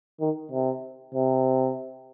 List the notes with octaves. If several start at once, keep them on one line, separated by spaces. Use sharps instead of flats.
D#3
C3
C3